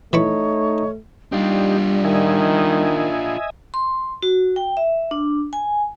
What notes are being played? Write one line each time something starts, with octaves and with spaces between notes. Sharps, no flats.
E3 A3 D#4 C#5 B5 C#6
G3 D4 D#4 F4 G4
D#3 D#5 E5 G#5
C6
F#4
G5
E5
D4
G#5